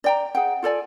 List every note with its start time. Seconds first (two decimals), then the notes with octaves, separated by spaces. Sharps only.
0.04 D5 G5 A#5
0.35 G#4 F#5 G5
0.63 F4 A4 D5 G#5